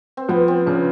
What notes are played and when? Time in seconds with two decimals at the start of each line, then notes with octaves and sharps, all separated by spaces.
0.17 C4
0.29 F3 B3
0.48 C4
0.67 C#3 D4